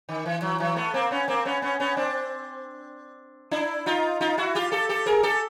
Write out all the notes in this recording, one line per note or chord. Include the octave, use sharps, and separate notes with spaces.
D#3
E3
E3 F#3
E3 F#3
A3 B3
A#3 C4
B3 C#4
A#3 C4
B3 C#4
B3 C#4
B3 C#4
C4 D4
D4 E4
D#4 F4
D#4 F4
E4 F#4
F4 G4
G4 A4
G4 A4
G#4 A#4
G4 A4